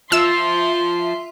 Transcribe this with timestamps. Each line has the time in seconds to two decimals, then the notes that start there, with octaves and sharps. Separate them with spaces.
0.12 F3 F4 E5 C6 E6